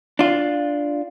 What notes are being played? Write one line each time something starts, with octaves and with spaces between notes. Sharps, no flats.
D4 F4